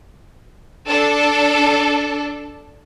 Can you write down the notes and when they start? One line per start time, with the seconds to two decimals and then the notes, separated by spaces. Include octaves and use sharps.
0.88 D4 A4